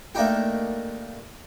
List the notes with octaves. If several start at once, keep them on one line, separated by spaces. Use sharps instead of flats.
A3 A#3 D4 D#4 G4